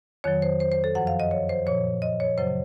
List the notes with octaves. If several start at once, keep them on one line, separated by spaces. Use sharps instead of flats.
F2 D#3 F#3 C#5
C5
C5
C5
A4
F#2 F3 F#5
F5
D#5
C#5
C5
A#2 F3 C#5
D#5
C#5
F#2 C#3 F#3 C5